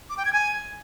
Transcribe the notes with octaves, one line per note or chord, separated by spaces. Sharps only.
D6
G5
G#6
G#5